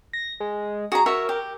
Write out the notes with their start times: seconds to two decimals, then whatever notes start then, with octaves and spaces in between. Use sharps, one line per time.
0.13 A#6
0.40 G#3
0.92 F#4 G#4 A#5
1.06 F#4 A#4 C#5 E5
1.29 G4